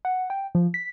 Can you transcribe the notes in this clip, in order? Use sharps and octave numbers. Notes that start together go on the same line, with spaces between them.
F#5
G5
F3
B6